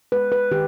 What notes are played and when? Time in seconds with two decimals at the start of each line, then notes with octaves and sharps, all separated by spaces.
0.12 G#3 B4
0.32 B4
0.51 D#3 G4